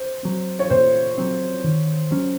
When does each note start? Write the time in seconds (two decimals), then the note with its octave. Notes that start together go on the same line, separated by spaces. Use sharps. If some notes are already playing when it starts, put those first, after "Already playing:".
Already playing: C5
0.23 F#3 C4
0.59 C#5
0.70 A#2 C5
1.18 F#3 C4
1.64 D#3
2.11 F#3 C#4